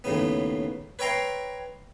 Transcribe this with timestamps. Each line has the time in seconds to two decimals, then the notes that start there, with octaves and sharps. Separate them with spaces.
0.04 D#2 A2 C#3 B3
0.99 B4 C#5 E5 G5 A#5 C6